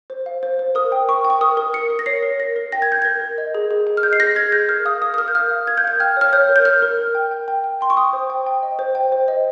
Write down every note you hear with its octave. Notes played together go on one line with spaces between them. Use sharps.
C5
F5
C5
C5
A#4 D#6
G5
A#4 C#6
G5
C#6
A#4 D#6
A#4
A#4 C#7
A#4
A#6
C#5 C7
A#4
A#4 A#6
A#4
G5 A#6
G#6
G5 G6
A#4 G#6
A#4
D#5
G#4
G#4
G#4
F6
D#5 G6
C7
G#4 A#6
G#4 G#6
G#4 G6
A#4 F6
F5 D#6
A#4 D#6
D#6
A#4 F6
G6
F5 F6
F5
A#4 G#6
G6
F5 G#6
G5 F6
C#5 F6
C#5 G6
A#4
G6
A#4 F6
A#4
A#4
G5
G5
G5
G5
G5 C6
C#6
G5 D#6
C5
G5
G5
D#5
C5
G5
C5
D#5